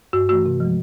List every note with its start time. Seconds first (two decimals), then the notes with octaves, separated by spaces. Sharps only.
0.13 G2 F#4
0.29 E3 A3 F#4
0.46 C3
0.60 F3 G#3